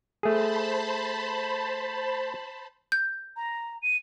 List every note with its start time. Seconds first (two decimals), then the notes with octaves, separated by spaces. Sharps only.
0.23 A3 G#4 C5 A5 B5
2.92 G6
3.36 A#5
3.82 D#7